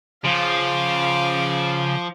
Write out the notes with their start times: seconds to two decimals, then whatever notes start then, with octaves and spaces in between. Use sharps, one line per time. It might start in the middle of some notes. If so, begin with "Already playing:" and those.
0.24 C#3 F3 F5 D6